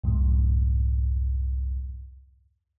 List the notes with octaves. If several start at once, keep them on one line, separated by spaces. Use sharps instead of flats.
C2 F2 G#2